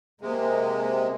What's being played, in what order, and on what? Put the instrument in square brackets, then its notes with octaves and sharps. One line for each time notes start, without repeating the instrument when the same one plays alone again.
[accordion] C3 G#3 [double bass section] A#3